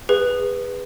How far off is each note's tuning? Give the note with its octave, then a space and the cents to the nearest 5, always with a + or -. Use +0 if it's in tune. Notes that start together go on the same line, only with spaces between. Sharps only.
G#4 -30 B4 +0